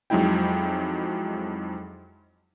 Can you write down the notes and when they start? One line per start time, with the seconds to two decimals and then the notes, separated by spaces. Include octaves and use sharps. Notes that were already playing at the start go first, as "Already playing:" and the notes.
0.10 F2 F#3 G#3 D#4 E4 G5